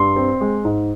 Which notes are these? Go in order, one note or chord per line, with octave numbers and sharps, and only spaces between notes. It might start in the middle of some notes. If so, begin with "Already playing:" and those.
Already playing: G2 C6
C4
G#3
G#2